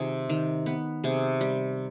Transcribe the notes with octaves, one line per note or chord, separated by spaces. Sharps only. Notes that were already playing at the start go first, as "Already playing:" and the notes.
Already playing: C3 D#3 F4 G#4
D#3
B3
C3 G#4
G3